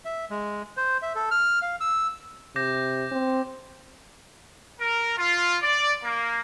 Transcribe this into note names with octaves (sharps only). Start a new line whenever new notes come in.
E5
G#3
C5
E5
A4
F6
F5
E6
C3 D6 G6 A#6
C4
A#4
F4
D5
A#3